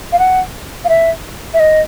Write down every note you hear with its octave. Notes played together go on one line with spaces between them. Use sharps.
F5
F#5
F5
E5
E5
D#5